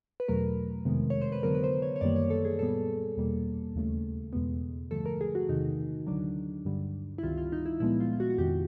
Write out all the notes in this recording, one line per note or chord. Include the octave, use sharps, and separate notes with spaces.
B4
E2 B2 F#3 A3 A#4
F2 C3 D#3 G#3 B3
C#5
C5
B4
F2 D3 F#3 B3 A#4
B4
C5
C#5
C#5
F#2 D#3 G3 A#3 D5
C#5
A4
G#4
A#2 G3 B3 A4
E2 B2 G3 A#3
D#2 C#3 E3 A3
E2 B2 G#3 B3
G2 D3 F3 A3 A4
A#4
G#4
F#4
E2 C3 D#3 D#4
D2 D3 F#3 D4
G2 D3 G3
E4
C#2 C3 D#3 G3 F4
F4
D#4
E4
A#2 F3 G#3 B3 E4
F4
F4
F#4
F#4
F2 C3 D#3 G4